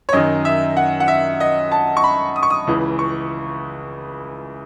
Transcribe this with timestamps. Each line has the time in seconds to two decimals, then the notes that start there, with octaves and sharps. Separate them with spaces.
0.09 C#5
0.13 F#2 D#3 D#5
0.45 E5
0.77 F#5
1.00 F#5
1.08 E5
1.40 D#5
1.72 A5
1.97 C#6
2.04 B5
2.36 D#6
2.43 C#6
2.50 D#6
2.67 C#2 C#3 E3
2.99 C#6